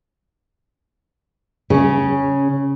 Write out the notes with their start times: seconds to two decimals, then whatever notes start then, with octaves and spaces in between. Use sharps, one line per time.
1.70 C#3 C#4